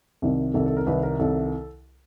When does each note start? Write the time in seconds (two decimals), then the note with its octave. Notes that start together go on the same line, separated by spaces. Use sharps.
0.22 C2 C3 D#3
0.54 C2 C3 D#3 A4
0.66 A4
0.77 A#4
0.87 C2 C3 D#3 B4
1.03 A#4
1.19 C2 C3 D#3 A4